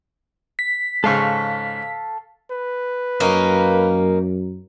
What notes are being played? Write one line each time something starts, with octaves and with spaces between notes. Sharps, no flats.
B6
G#2 C#3 A4 F5 C#6
B4
F#2 A#3 C#4 D#4